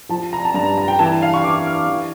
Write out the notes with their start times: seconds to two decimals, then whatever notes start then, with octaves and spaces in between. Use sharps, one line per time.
0.09 F3 A5
0.33 A#5
0.45 A5
0.54 G2 A#5
0.78 A#5
0.88 G5
0.99 E3 A5
1.22 F5
1.34 C#6
1.44 E3 D6
1.67 F6
1.89 E3